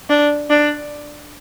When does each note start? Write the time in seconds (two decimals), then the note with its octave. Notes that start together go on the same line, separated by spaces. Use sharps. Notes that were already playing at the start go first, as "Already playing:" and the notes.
0.09 D4
0.50 D4